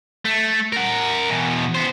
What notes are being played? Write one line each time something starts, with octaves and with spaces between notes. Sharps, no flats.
A3
A#4 F#5
B2 E3
B3 C5